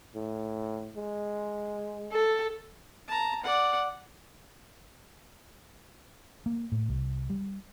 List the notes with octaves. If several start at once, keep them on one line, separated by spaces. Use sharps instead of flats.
A2
G#3
A4
A5 A#5
D5 F#5
A#3
A2
C2
G3